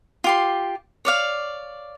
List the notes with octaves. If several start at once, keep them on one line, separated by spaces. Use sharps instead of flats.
F4 G4 C6
C#5 D5 F5